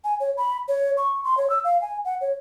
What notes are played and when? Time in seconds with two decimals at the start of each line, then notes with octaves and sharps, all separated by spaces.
0.04 G#5
0.20 C#5
0.37 B5
0.68 C#5
0.97 C#6
1.24 C6
1.37 C#5
1.50 E6
1.64 F5
1.82 G#5
2.05 F#5
2.21 C#5